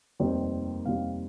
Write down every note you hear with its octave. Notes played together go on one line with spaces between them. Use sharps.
F1 D#2 D#3 G3 C4
F1 D#2 D#3 G3 C4 F5